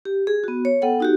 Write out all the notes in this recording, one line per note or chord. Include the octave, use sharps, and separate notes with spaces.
G4
G#4
B3 F#4
C#5
B3 A4 F#5 G5
D#4 F#4 G4